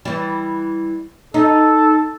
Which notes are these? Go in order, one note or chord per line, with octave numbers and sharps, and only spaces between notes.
E3 G3
D#4 A4